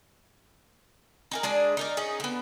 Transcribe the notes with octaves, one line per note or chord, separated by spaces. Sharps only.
D#4 G#4 A#4
G#3 D4 G#4 D5
D#4 A#4 D5
C#4 D#4 G#4
D3 B3